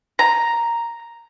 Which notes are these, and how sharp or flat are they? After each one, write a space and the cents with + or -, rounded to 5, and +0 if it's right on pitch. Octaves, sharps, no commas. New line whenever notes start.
A#5 +0